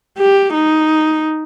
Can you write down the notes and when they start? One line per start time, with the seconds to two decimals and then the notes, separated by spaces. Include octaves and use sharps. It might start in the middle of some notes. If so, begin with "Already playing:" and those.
0.18 G4
0.54 D#4